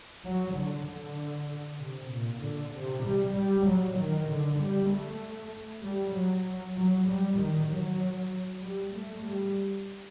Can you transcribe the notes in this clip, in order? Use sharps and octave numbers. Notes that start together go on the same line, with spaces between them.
F#3
D3
D3
C3
A#2
D3
C3
G3
G3
F#3
D#3
D3
G3
A3
G3
F#3
F#3
G3
D#3
F#3
G3
A3
G3